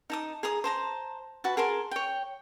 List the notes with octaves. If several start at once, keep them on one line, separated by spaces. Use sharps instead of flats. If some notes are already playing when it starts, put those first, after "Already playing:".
D#4 A5 D#6
G#4 A#5 D#6
C5 A5 A#5
F#4 B4 A5
G#4 A#4 A5 C6
C#5 G5